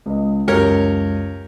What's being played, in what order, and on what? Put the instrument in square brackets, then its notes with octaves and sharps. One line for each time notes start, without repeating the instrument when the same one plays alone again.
[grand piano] C#2 D#5
[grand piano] C#2 F#2 [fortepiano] G4 A#4 C#5